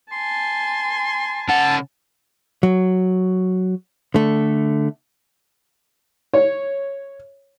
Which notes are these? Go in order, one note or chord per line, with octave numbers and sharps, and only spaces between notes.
G#5 A5 C6
C#3 F#5 A5
F#3
D3 A3
C#5